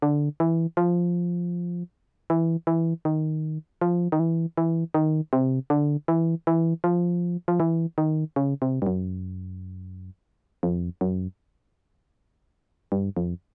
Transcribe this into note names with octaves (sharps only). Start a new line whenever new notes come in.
D3
E3
F3
E3
E3
D#3
F3
D#3
E3
E3
D#3
C3
D3
E3
E3
F3
F3
E3
D#3
C#3
C3
G2
F#2
F2
F#2
G2
F2